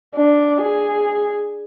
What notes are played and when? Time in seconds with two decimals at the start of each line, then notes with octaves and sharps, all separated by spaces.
0.16 D4
0.62 G#4